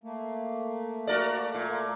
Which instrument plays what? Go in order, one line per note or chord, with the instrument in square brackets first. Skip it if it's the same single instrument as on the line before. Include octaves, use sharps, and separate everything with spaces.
[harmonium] A3 A#3
[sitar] F#4 A#4 D5
A#2